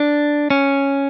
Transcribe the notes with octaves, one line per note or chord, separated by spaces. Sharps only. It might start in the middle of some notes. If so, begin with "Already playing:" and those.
Already playing: D4
C#4